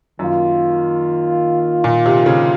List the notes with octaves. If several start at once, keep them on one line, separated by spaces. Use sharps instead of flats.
F#2 D#3 A#3 F4
A#2
C3
C#3